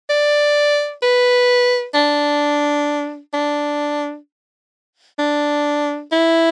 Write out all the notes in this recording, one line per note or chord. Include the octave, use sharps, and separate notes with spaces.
D5
B4
D4
D4
D4
E4